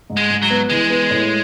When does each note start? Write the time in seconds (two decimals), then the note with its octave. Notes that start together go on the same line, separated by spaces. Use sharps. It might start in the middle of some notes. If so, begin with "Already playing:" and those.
0.10 G#2
0.17 G#3
0.30 G#2
0.42 F#3
0.50 B3
0.69 E3 G#3
0.90 B3
1.11 A2